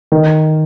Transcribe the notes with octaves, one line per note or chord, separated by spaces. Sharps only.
D#3